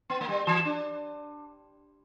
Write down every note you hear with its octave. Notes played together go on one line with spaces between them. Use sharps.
B3
A#3
G3
E3
D4